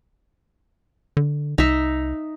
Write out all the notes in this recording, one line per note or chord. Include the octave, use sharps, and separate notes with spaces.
D3
C2 D#4 E5